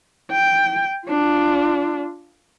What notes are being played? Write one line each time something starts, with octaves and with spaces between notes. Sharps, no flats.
G5
D4 F4